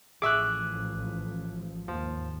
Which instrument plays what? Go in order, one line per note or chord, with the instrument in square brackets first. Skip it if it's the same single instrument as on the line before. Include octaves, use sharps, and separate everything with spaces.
[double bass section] A1 F3 [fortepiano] G#4 E5 C#6 [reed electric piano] D6 F#6
[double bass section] D#2 G#2 [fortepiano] F3